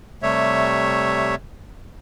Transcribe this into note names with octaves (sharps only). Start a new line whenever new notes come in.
C3 G3 A3 C#5 E5